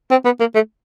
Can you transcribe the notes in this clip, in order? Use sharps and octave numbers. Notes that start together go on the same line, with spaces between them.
C4
B3
A#3
A3